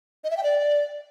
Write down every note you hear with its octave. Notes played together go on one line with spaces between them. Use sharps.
D#5
E5
G5
D5